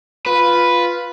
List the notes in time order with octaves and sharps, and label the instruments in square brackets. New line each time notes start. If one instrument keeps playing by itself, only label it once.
[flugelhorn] F4 [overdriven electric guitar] B4